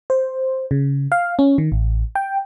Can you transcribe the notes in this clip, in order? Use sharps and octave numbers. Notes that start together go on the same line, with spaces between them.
C5
C#3
F5
C#4
D#3
A1
G5